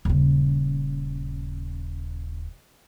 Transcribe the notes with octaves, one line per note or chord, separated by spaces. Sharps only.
D#1 C#3